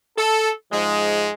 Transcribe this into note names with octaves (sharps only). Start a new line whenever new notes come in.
A4
G#2 F3 G#3